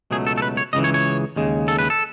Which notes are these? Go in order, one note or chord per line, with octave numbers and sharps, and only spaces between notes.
C#2 B2 F#3 A3 G#4
A4
A4
B4
C#5
C#2 C#3 E3 D#5
C#5
C#5
D#2 C#3 G#3
A4
B4
A4